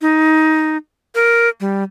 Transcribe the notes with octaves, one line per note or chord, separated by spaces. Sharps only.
D#4
A#4
G3